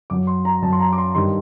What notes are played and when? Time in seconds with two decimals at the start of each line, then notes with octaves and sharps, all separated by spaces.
0.10 F#2 F#3 D6
0.27 C6
0.45 A#5
0.62 F#2 A5
0.67 F#3
0.73 C6
0.80 A#5
0.93 D6
0.98 C6
1.15 G2 D#3 G3 C6